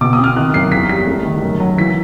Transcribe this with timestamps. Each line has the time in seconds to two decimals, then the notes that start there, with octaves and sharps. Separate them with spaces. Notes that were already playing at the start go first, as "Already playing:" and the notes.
0.01 B2 D6
0.13 D#6
0.19 C4 F6
0.36 D#3 F#6
0.54 F#2 C7
0.71 E2 B6
0.89 G3 B6
1.07 A3
1.25 D#3
1.42 F#2
1.60 F#3
1.78 E3 B6